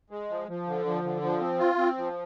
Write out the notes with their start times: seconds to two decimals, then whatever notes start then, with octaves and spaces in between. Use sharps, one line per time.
0.10 G#3
0.30 F3
0.48 F3
0.67 D3
0.86 F3
1.04 D3
1.22 F3
1.41 C4
1.59 F4
1.78 C4
1.97 F3